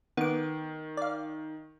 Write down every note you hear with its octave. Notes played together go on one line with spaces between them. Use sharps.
D#3 B3 D6
D5 F5